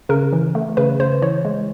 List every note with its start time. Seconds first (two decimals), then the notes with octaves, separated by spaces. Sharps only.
0.09 C#3 A#4
0.33 E3
0.55 A3
0.77 C#3 B4
1.00 C#3 C5
1.22 E3 C#5
1.45 G#3